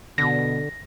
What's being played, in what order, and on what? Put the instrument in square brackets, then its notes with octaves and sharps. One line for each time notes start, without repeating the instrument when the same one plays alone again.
[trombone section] B2 [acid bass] D3 [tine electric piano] A#6